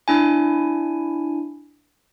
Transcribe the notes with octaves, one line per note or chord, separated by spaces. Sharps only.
D4 E4 G#5